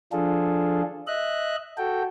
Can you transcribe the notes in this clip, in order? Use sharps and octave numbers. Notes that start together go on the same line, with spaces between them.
F3 D4 F4 G#4 A4
D#5 E5 F#6
F#4 A4 G5